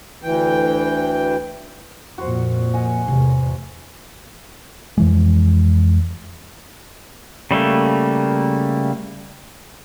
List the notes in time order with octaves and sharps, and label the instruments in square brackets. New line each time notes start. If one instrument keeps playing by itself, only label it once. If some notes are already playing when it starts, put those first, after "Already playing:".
[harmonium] D2 E3 G5
[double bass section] F2 A#2 [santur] F#4 C5 F#5
[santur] D#5 F#5 G#5
[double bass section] E2 A2 [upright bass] C3 F4
[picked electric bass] F2 E3 G#3
[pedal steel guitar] C#3 G3 A3 A#3